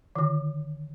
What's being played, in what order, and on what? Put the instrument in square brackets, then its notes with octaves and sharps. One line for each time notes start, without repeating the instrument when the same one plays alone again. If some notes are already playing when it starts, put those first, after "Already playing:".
[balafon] D3 D#3